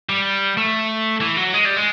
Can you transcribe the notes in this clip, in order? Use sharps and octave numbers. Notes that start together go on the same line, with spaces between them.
G3
A3
E3
F#3
G#3
G3
G#3